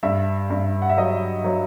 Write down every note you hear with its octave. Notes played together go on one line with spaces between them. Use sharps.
G2 E5
G2
F#5
E5
F#3 D#5
F#3